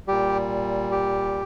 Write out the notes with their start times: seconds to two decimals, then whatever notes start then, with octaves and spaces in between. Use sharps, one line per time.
0.07 A#2 G3 G4
0.92 G4